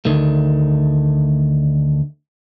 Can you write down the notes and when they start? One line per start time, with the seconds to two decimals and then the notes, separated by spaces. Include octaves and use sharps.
0.05 D2 D#3 A3